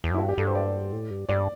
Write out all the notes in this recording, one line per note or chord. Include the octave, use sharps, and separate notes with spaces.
E2
F#2
E4
G2 F#4
G4
G2 A4
C5
D5
A2
G2
G2 D5